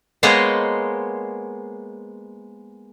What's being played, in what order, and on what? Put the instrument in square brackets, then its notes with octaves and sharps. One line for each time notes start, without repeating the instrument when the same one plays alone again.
[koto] G#3 A#3 B3 C5 C#5 D#5